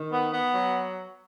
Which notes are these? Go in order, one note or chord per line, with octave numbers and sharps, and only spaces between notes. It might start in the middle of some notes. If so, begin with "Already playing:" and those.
Already playing: D#3
B3
B3
F#3